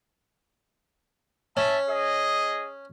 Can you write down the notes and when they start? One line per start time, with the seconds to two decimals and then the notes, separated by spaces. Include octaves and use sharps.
1.57 C#4 E5 A5
1.89 G#4 D#5